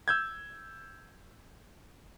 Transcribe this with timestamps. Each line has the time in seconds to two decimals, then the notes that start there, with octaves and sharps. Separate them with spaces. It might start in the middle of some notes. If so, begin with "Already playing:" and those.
0.08 E6 G6 G#6